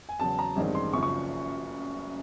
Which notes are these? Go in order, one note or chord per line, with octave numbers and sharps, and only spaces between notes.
G#5
E2 C#3 F#3 A5
A#5
A1 G2 D#3 G#3 C4
C6
F#1 F#2 C#3 F3 C#6
C#6